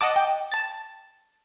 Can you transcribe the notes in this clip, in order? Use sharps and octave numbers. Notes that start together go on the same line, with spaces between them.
D#5 F#5 A5 D6
G5
A5 A6